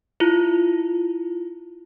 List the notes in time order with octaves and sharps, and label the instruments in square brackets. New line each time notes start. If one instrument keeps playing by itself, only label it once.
[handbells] E4 F4